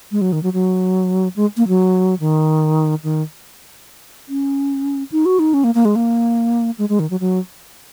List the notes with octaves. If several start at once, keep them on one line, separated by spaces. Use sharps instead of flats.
G#3
F#3
D#3
F#3
F#3
G#3
A#3
F#3
D#3
D#3
C#4
D#4
F#4
D#4
C#4
A#3
A#3
G#3
A#3
G#3
G#3
D#3
F#3
F#3